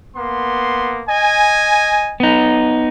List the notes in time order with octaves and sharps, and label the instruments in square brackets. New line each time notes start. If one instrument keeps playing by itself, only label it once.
[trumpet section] A#3 B3 C6
D#5 G#5
[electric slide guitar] B3 D#4